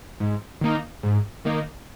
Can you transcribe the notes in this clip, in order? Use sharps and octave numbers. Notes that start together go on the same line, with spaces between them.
G#2
D#3 A#3 D#4
G#2
D#3 A#3 D#4